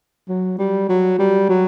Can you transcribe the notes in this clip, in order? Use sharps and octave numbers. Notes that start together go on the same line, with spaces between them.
F#3
G3
F#3
G3
F#3